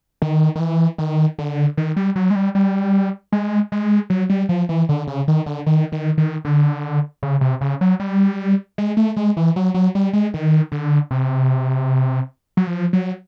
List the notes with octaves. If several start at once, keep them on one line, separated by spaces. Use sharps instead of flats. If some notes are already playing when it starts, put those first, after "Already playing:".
D#3
D#3
E3
D#3
D3
D#3
G3
F#3
G#3
G3
G3
G#3
G#3
F#3
G3
F3
E3
D3
C#3
D#3
D3
D#3
D#3
D#3
D3
C#3
C3
C#3
F#3
G3
G#3
A3
G#3
E3
F#3
F#3
G3
G#3
D#3
D3
C3
F#3
F3
F#3